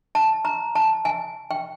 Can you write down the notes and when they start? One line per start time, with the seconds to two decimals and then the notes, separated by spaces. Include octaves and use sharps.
0.15 A5
0.45 A#5
0.75 A5
1.05 G#5
1.51 G5